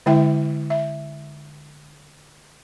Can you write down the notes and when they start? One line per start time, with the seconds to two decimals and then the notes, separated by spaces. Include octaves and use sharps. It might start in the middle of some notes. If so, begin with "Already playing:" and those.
0.06 D3 G#3 E4 E5 G5
0.70 E5